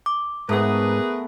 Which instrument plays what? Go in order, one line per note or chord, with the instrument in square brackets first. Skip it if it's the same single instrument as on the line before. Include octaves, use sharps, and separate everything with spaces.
[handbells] D6
[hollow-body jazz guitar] G#2 [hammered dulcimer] A3 B3 [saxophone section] G#4 A#4 B4